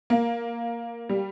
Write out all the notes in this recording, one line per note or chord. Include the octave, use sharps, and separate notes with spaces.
A#3
G3